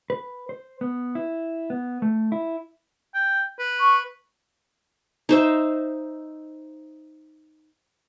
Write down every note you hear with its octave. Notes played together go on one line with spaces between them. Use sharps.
B4
C5
B3
E4
B3
A3
E4
G5
B4
C#6
D#4 C5 E5